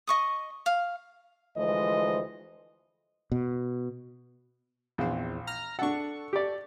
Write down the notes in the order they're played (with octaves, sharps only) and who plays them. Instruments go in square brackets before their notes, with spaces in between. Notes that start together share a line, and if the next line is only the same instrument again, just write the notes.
[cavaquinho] D#5 C#6 D#6
F5
[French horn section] D2 E3 F3 G#3 C5 D#5
[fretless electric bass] B2
[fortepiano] A#1 [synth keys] E2 C4
[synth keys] A#5 F6 A#6
[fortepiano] D4 F#5 [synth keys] A4 C#6
[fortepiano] G4 D5